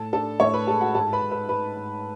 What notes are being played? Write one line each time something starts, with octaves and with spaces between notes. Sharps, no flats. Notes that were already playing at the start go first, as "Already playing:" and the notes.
Already playing: A2 A4 A5
D4 A4 A5
A2 C#5 C#6
B4 B5
G#3 A4 A5
F#4 F#5
G#2 A4 A5
B4 B5
G#2
B4 B5
G#2 B4 B5
G#2